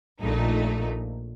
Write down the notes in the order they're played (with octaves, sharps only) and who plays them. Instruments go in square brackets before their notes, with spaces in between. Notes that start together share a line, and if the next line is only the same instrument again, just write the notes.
[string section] A#1 A#2 A3 D#4